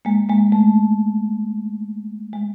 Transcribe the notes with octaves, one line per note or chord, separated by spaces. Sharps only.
G#3 A#3
G#3 A#3
A3
G#3